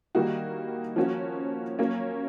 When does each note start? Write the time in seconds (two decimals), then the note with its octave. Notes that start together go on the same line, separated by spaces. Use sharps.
0.15 D#3 G3 A#3 D#4 F#4
0.96 F3 A#3 C#4 F#4
1.79 F#3 A#3 C#4